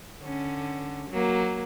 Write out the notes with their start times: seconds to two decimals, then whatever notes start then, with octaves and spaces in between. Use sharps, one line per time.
0.21 D3 C#4
1.10 F#3 A#3